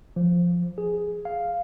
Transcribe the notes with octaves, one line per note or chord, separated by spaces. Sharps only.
F3
G#4
F5